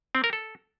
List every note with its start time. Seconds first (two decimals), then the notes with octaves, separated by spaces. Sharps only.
0.15 C4
0.24 A#4
0.33 A4